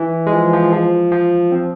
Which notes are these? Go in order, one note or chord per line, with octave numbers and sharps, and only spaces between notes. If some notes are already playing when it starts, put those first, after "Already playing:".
Already playing: E3
G#3
F3
F3
F3
F3
C4